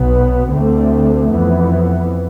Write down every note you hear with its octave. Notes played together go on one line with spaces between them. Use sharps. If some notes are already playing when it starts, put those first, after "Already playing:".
Already playing: B1 B2 B3
D2 D3 A3 C4
F2 E3 B3